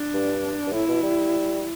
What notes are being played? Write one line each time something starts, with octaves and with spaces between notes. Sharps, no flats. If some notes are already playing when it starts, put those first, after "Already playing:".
Already playing: D4
G2
G2
A2 E4
B2
G3